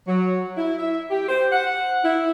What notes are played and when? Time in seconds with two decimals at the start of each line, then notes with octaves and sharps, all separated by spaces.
0.07 F#3
0.57 E4
0.78 E5
1.10 G4
1.28 C5
1.52 F#5
2.03 E4